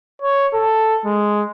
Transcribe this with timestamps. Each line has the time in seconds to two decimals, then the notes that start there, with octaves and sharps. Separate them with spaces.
0.22 C#5
0.54 A4
1.05 G#3